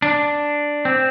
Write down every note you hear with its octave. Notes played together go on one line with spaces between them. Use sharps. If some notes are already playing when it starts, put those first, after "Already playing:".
D4
C4